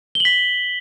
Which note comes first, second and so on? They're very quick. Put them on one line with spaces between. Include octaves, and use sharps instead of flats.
G7 F#7 B6